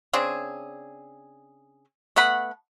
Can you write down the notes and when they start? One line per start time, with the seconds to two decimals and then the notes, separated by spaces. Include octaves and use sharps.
0.13 C#3 C4 D4 G#4
2.16 A3 B3 F#5 B5